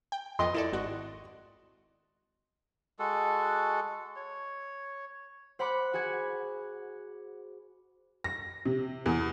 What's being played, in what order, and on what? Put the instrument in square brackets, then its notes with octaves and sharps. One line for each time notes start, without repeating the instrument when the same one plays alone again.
[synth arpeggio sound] G5
[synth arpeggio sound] F2 B3 D6 [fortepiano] D#5 C6
[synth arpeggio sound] E4 A4 D5
G#1 F#4
[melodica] G#3 F#4 A4
C#5
[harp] C5 F#5 B5 C6 D6 F#6
F#4 G#4 F#5 G#6
[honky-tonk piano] A#6
C3
E2